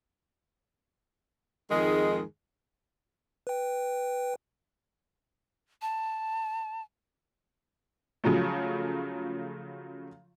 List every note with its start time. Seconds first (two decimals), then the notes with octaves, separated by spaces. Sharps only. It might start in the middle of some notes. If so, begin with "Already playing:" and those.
1.70 F2 G#2 D#3 G#3 G#4
3.47 B4 G5
5.82 A5
8.24 C#3 F3 F#3 A3